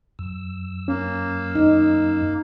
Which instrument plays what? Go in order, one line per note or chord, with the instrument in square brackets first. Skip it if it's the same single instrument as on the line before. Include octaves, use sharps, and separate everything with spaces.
[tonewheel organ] F#2 E6
[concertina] A#3 [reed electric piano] C#4
[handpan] D#4